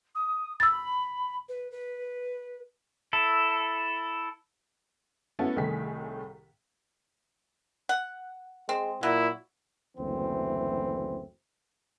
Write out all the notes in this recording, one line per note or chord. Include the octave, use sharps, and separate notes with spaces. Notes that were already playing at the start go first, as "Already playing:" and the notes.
D#6
B5 E6 A6
B4
B4
E4 A4
A3 B3 C#4 E4 F#4 A4
C2 A2 D#3 G#4 B6
F#5
G#3 C4
A#2 F#3 E4
F#1 D2 E3 C4